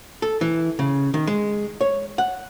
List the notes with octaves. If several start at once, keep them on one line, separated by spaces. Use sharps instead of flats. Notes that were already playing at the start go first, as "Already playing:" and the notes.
A4
E3
C#3
D#3
G#3
C#5
F#5